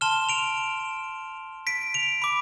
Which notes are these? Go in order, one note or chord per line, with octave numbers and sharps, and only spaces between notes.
A5 C6 F6 E7 G7
D7 F7
B6 D7
D7 F7
B5 D6